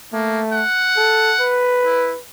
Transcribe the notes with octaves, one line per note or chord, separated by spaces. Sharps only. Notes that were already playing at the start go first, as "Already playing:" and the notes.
A3 A#3
F#5
A4
B4
E4